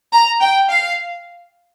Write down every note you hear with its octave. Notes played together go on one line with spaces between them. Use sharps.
A#5
G5
F5